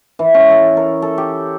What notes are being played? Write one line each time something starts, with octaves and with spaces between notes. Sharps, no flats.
E3
C#4
A4
A#4
A4
G4